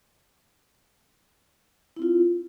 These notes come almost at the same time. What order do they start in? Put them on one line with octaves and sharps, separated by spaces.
E4 C4 F4